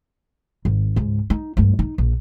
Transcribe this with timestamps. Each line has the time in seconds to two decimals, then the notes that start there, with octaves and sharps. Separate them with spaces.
0.65 G#1
0.96 C#2 G#2
1.30 D#4
1.57 D2 G2
1.79 D#4
1.98 A#1